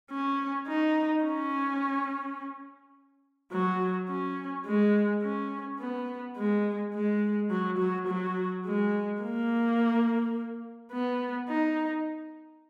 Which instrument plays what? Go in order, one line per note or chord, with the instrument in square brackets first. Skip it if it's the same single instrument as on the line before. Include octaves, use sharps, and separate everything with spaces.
[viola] C#4
D#4
C#4
F#3
C#4
G#3
C#4
B3
G#3
G#3
F#3
F#3
F#3
G#3
A#3
B3
D#4